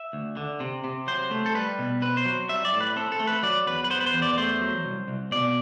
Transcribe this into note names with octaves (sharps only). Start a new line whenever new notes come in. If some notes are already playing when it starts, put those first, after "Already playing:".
Already playing: E5
D2
D3
C3
C3
F#3 C5
A3
A4
G3 B4
B2
C4 B4
C5
F#3
G3 E5
D5
A2
B4
C4 A4
A4
A3
B4
F#3 D5
E2 B4
B4
B3 C5
B4
C5
E2
D5
A3 C5
F#3
C2
C2
B2 D5